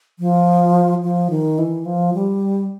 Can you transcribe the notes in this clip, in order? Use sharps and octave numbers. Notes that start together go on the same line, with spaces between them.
F3
F3
D#3
E3
F3
G3